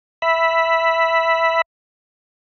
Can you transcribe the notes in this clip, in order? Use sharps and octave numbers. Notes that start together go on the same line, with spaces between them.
E5 B5